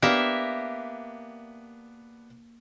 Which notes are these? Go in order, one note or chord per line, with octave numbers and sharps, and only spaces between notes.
A#3 B3 D4 G4 A#4 E5